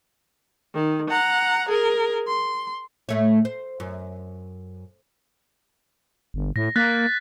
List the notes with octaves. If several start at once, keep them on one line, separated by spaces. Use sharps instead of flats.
D#3
F#5 A#5
G#4 A#4
C6
A2 A3 C#5
C5
F#2
G1
A2 A#6
A#3 F#6 A6 B6